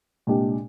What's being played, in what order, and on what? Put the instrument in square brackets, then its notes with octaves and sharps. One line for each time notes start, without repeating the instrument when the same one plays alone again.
[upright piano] C2 A#2 G#3 D4 G4